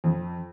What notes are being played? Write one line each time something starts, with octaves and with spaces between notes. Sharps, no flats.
F2